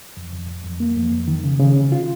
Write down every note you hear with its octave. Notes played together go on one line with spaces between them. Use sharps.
F2
F2
F2
F2
A#3
F2
F2
D#3
C#3
C#3
C#3
F4